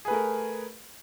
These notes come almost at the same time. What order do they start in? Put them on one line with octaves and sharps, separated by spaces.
G#4 B4 A3 A#4